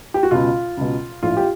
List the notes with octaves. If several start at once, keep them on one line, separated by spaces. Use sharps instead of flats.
G4
F#4
C#2 B2 F4
C#2 B2
A#1 A2 F3 F4
G4